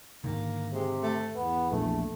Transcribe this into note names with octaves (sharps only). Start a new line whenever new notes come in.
G#2 D3 D#3 A#3
C3 G#3
A3
E2 B3
A#1 A3